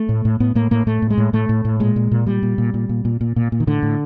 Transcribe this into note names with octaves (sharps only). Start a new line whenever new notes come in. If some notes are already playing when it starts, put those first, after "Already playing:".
Already playing: A3
A2
A2
A2 B3
A2 A#3
A2 A#3
A2 A3
A2
G#3
A2
A2 A3
A2
A2
A#2 G#3
A#2
A#2
A#2 G3
A#2
A#2
A#2
A#2
A#2
A#2
A#2
A#2
D#3
A2 D3
A2